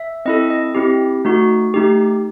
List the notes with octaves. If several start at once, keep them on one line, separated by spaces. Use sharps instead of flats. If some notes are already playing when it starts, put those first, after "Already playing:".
Already playing: E5
C4 E4 A4 D#5
D#5
C4 E4 G4
A3 D#4 F#4
A3 D#4 G4